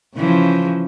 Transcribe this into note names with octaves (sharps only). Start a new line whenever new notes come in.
C#3 E3 F3